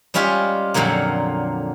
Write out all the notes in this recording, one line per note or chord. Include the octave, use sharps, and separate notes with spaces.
G3 G#3 C#4 F4 G4
F2 A#2 D3 F#3 A#3